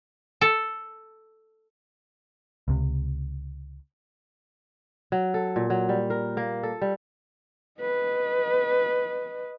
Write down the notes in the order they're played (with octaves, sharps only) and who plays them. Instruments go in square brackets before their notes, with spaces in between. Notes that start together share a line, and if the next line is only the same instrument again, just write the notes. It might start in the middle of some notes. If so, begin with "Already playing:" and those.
[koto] A4
[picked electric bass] C#2 C3
[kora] F#3
A4
A#2
F#3
G3
A#4
A#3
A4
G3
[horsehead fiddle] B4 D#5